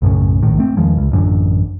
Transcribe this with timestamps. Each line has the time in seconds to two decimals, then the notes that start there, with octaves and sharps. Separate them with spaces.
0.02 B1 F#2 A2 C#3
0.43 A#1 A2 D#3
0.59 A3 C4
0.77 E2 D#3 F3 G#3
0.97 C#2
1.12 A1 F#2 D3